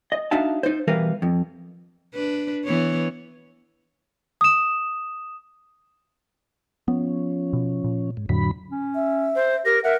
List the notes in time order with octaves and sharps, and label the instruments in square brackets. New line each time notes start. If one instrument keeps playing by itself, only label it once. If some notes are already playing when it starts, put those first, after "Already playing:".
[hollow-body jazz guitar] D#5
D4 D#4 F#4 E5 F5 A5
D#4 C5
B2 E3 G3 A#4 B4 F5
F2
[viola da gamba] D4 B4
E3 B3 C#5
[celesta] D#6 E7
[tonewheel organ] F3 C#4 [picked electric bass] B3
[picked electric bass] B2
A#2
[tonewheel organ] G#2
[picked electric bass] F2 A2 [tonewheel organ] D3 F#3 B5
[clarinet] C#4
[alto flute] E5
[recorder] C5
[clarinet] G4 [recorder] A#4 [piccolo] A#6
[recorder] A#4 [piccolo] E5 [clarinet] F#5